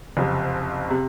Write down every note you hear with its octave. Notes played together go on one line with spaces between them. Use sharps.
F#1 F2 C3
C3